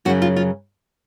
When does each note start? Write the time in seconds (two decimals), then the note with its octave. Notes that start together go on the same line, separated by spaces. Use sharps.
0.05 F#2 C#3 F#3 F#4
0.22 F4
0.36 F4